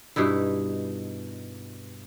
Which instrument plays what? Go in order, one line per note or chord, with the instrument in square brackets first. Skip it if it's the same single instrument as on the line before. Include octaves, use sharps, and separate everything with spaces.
[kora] G2 B2 D#4 E4